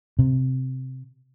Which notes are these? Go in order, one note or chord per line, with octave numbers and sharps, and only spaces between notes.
C3